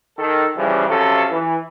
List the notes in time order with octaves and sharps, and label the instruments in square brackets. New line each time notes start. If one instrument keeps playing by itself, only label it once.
[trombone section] D#3 A4
C#3 E3 F3 G3
C3 F3 F#3 C#4 A4
E3